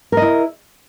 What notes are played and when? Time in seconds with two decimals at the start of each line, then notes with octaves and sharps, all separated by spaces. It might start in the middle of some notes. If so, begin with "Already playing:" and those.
0.12 A#4
0.17 D#5
0.22 E4